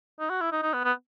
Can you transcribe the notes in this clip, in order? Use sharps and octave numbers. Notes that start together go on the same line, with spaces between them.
D#4
F#4
E4
D#4
D#4
B3
B3